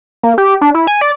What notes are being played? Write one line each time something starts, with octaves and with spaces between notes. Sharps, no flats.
A#3
G4
D4
E4
G#5
D5